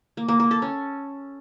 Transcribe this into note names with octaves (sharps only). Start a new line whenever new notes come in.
A#3
A#3
A#3
A4
C#4